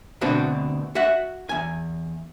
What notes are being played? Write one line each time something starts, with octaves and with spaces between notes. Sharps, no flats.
D2 B2 C4 D4 F#4
F#4 E5 F#5
E2 G#5